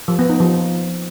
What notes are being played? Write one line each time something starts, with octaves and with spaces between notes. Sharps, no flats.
F3
B3
D#4
F3